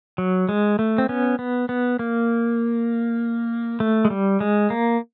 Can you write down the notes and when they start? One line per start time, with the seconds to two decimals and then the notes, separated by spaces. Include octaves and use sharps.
0.18 F#3
0.49 G#3
0.79 A3
0.98 C4
1.09 B3 C#4
1.39 B3
1.69 B3
1.99 A#3
3.80 A3
4.05 G#3
4.10 G3
4.40 G#3
4.70 A#3